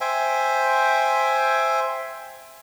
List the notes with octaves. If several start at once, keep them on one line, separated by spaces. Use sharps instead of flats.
C5 E5 G5 G#5